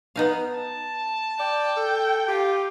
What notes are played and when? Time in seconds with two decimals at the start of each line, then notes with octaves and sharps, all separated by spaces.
0.16 B3 D#4 F5
0.53 A5
1.39 D5 G5
1.77 A4
2.28 F4 G4